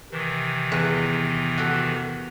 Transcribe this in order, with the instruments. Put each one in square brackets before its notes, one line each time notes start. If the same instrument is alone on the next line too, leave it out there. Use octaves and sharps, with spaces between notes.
[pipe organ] C3 D#3 E3
[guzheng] E2 B4
F#4 A4